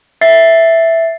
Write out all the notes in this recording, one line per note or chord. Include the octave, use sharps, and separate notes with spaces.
E5 A6 C7